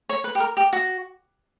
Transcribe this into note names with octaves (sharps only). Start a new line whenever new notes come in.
C#5
B4
G4
A#4
G4
F#4